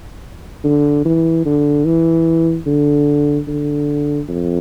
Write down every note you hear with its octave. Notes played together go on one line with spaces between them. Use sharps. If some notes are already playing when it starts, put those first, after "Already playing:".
D3
E3
D3
E3
D3
D3
F2